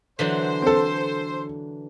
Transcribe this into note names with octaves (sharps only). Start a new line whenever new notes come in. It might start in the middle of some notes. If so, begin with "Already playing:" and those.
D3 E3 F#3 C5
C4 A4